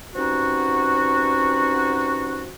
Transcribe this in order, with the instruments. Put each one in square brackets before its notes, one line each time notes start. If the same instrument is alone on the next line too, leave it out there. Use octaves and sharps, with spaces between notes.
[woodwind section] G2 C4 C#4 D#4 F#4